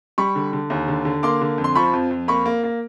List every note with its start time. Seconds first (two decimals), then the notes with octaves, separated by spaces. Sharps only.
0.18 G3 B5 C#6
0.35 D3
0.53 D3
0.70 D#2
0.88 D3
1.05 D3
1.23 A#3 C6 D6
1.41 D3
1.58 F2
1.64 C6
1.75 F3 B5 C#6
1.93 F2
2.11 F2
2.28 A#3 B5 C#6
2.46 A#3
2.64 A#3